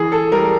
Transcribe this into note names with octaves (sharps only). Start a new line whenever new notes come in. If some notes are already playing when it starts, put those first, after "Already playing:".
Already playing: E3 G#4
A4
G3 A#4